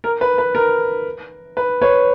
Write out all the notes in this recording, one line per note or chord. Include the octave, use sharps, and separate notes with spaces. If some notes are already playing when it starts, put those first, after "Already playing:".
A#4
B4
B4
A#4
B4
B4 C#5